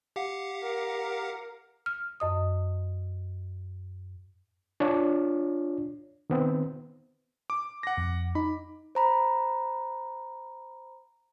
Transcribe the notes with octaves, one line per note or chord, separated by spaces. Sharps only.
G4 F5 F#5
A#4
F6
F#2 D#5 D#6
D4 F4 C#5
D#3 B3 C4
D6
F#5 A#6
F2
D#4 B5
C5 A#5 B5